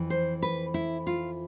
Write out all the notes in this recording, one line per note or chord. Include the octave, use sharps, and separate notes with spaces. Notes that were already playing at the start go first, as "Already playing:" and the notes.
Already playing: F2 E3
C5
B4
E4
F4